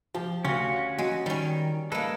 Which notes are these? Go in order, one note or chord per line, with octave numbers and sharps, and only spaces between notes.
F3 G4
D2 C#4 F4 F#4
F#3 G#3
D#3 G3 C#4
G#3 A#3 A4 B4